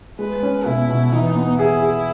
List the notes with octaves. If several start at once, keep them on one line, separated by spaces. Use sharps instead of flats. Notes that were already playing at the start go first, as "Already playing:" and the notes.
G#3 B4
C#4
B2 E4
B2
E3 D#4
B3
E4 G#4
G#4